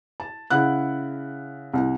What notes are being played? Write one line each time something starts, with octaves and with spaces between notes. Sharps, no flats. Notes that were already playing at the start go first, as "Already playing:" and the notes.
A5
C#3 E4 F#5 F#6
C2